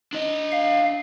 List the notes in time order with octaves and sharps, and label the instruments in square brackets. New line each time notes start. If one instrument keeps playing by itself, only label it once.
[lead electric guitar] D4 D#5
[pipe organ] F5